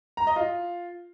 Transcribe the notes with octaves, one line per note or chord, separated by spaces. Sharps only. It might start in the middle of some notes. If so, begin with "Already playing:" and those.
A#5
D#5
F4